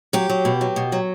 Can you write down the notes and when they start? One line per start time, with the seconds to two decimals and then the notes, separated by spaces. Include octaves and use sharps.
0.13 F#3 G4
0.30 F#3
0.45 B2
0.61 F#3
0.76 B2
0.92 F#3